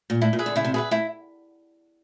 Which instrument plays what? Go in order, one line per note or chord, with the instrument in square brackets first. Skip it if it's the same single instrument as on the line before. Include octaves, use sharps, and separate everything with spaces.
[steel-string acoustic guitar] A#2
[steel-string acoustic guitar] A2 [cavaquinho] E4
[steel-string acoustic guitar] A#2
[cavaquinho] G#4 B4 E5
[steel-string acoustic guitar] D3
[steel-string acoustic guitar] C#3 [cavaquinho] E4
[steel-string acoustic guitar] C3
[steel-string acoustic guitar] B2 [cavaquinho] G#4 B4 E5
[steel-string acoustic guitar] A2 [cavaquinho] E4